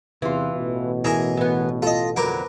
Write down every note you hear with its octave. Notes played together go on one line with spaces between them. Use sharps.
E2 C3 E3 F4
A1 B2
E3 G#4 A#4 E5 G#5
E3 B3
F4 A4 D#5
F2 D3 F#3 A#4 B4 D6